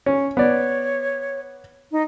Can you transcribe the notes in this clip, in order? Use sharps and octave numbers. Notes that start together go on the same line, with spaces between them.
C#4
B3 C#5 D5
D#4